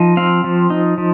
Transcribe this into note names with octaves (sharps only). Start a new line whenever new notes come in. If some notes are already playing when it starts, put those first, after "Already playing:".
Already playing: F3 D#4
C4 F5
F3
D#4
F3